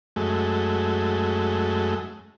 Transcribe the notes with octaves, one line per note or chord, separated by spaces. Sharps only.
F#2 G#3 A3